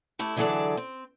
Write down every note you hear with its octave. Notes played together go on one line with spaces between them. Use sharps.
A3 E4 G4
D3 E3 F#3 G#4 A4 D5
C4